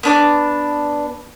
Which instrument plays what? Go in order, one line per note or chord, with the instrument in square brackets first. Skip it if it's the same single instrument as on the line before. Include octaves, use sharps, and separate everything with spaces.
[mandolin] B3 D4 D6